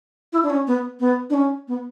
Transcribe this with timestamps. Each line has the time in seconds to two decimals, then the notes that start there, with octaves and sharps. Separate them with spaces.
0.33 E4
0.43 D4
0.50 C#4
0.67 B3
1.00 B3
1.30 D4
1.34 C#4
1.68 B3